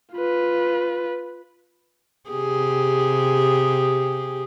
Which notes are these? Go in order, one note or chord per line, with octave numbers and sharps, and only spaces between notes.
F4 B4
C3 G4 G#4